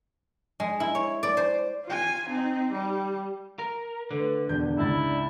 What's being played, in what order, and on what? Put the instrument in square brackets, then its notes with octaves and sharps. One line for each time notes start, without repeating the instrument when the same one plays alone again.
[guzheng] G#3
E4
C#5
D5
C5
[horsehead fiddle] F4 G#5
C4 D#4
G3
[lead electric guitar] A#4
[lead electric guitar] D3 [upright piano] A3 [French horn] B4
[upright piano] E1 E2 G6 [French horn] D4
[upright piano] C#2 G#2 A6 [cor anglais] E4